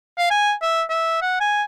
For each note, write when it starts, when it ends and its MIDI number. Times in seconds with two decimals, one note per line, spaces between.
0.18 0.26 77
0.30 0.52 80
0.62 0.82 76
0.90 1.20 76
1.22 1.40 78
1.40 1.63 80